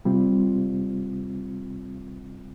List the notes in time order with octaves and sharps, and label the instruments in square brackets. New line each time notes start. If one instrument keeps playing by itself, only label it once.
[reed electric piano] C3 G3 C4 F4